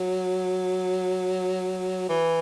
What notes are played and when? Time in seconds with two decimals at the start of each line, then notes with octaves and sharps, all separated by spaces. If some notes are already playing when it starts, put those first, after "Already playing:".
Already playing: F#3
2.09 E3